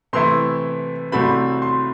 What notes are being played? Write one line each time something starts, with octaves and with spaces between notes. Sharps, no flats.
C3 E3 A3 E4 C6
C2 C3 F#3 A3 C4 B5
C6